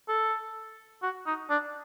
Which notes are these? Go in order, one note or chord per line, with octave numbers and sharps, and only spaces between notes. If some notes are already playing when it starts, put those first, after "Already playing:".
A4
F#4
D#4
D4